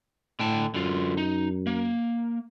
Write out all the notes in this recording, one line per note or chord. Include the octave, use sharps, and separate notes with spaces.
A2 D3 G5 A5
F#2 D3 F4
D#4
A#3